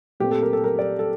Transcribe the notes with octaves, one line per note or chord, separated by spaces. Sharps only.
A#2 A3 C4 G4
A4
A#4
A4
A#4
D5
A4